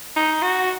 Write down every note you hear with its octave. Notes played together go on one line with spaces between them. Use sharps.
D#4
F#4